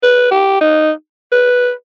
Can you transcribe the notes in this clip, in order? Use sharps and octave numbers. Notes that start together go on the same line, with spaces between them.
B4
G4
D#4
B4